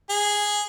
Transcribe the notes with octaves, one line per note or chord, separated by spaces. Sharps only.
G#4